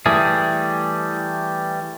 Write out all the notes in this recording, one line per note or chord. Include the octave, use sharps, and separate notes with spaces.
E3 G3 A3 G#4